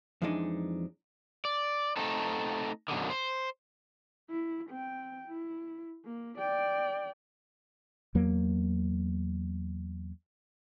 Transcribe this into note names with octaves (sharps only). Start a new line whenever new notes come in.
F2 E3 F3 G#3 D4 D#4
D5
A3 C4 D#4 A4
F#2 B2 D3 D#3
C5
E4
C4 G5
E4
A#3
D5 G5
E2 F#3 A#3